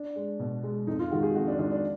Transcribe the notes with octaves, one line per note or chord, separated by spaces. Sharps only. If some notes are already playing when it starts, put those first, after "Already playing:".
Already playing: D4
G#3
B2
G#3
F2 D#4
F4
D#3 G#3 F#4
G#4
F2 F#4
D4
D#3 G#3 D4
D4